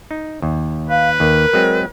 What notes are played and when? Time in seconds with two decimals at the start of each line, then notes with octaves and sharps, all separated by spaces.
0.11 D#4
0.42 D#2
0.90 B4 F5
1.20 D#2 A#4
1.53 F#3 G#3 C4